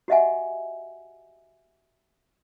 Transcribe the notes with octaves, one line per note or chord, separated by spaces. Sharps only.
F#4 G4 D#5 E5 F#5 G#5